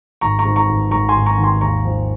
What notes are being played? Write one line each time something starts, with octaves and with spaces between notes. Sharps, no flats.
G#1 A#5 C#6
A#5 C#6
G#2
A#5 C#6
G#1
G#1 A#5 C#6
G#5 C6
G#1
A#5 C#6
D#3
G#5 C6
D#2 A#5 C#6
F3